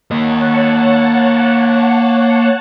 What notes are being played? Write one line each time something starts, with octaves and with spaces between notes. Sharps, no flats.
A#3 C#5 D#5 F#5 A5